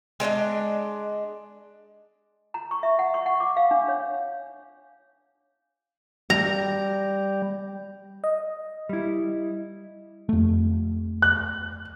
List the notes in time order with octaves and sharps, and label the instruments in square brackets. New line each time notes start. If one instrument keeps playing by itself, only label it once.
[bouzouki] G#3 D4 D5 D#5
[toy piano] A#5
C#6
E5
F#5
C#6
F#5
D6
F5
D4
C#5
[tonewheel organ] G3 [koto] A#5
[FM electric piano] D#5
[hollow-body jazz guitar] G3 E4
[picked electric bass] F2 A3
[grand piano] F#6